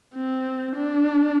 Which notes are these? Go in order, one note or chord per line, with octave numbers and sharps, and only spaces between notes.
C4
D4